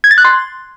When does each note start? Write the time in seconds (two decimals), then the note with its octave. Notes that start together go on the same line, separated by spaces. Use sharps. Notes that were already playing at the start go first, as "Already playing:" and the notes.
0.04 G#6
0.11 A6
0.18 F#6
0.25 C6